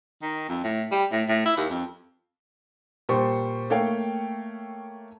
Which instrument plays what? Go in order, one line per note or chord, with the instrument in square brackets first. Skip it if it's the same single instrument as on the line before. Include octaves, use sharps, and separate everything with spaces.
[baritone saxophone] D#3
F2
A2
G3
A2
A2
E4
D#2
F2
[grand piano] A#2 G3 C5 C#6
A3 A#3 A4 C#5 F5 G5